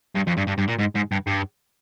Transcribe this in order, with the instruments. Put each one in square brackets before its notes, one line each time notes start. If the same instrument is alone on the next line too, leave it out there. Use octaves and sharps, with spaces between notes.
[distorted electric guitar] G2
F2
G2
G2
G2
A#2
G#2
G#2
G2
G2